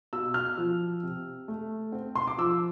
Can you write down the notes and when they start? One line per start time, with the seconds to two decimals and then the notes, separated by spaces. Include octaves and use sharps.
0.13 B2 E6
0.34 F6
0.58 F3
1.03 C3
1.48 A3
1.92 C4
2.15 C6
2.27 D6
2.38 F3 E6